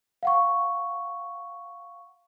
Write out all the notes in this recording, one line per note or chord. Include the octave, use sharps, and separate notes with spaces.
F5 F#5 C#6